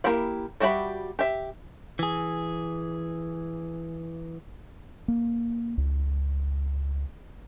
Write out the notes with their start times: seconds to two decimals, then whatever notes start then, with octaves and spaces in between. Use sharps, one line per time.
0.04 A#3 E4 G4 G5 B5
0.60 G3 F#4 G4 E5 B5
1.19 G4 E5
1.99 E3 G#4
5.08 A#3
5.78 C#2